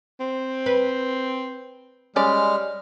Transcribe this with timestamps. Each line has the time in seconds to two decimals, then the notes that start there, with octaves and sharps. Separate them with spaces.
0.20 C4
0.66 B4
2.16 G3 G#3 C#4 D5 F6